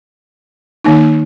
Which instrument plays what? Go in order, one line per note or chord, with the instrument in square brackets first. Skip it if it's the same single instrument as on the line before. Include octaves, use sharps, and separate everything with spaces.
[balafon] D#3 A#3 D#4